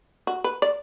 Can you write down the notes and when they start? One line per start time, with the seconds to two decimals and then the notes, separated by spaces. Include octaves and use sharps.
0.27 F#4
0.44 B4
0.62 D5